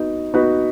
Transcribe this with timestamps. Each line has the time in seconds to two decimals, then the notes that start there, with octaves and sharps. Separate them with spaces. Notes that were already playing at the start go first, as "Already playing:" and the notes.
Already playing: B3 D#4 F#4
0.34 B3 D#4 F#4 B4